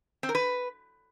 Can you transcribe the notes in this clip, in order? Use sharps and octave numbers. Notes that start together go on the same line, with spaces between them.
C4
A#4
B4